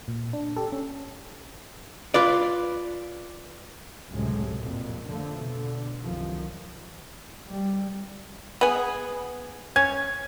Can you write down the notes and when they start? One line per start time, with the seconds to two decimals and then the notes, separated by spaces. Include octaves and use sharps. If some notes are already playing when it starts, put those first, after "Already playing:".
0.08 A#2
0.33 D4
0.56 G4 A4
0.72 C#4
2.14 F4 B4 D5
4.10 C#2 F#2 A2 C3 F#3 G#3
4.61 F2 A#2
5.05 D3 F3 A3
5.39 B2 D3
6.00 C2 F#2 D#3 F3
7.48 G3
8.61 B3 G#4
9.76 C#4 G#6